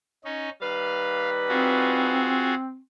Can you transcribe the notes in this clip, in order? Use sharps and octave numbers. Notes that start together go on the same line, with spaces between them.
C#4 D#4
D#3 G3 B4 F5
C4 F4 F#4 G#4